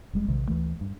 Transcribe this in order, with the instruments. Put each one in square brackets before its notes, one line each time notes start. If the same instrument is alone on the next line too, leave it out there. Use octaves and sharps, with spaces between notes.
[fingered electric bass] F1 G3 G#3
A#1 C3 D#3
D2 E3 A3
G2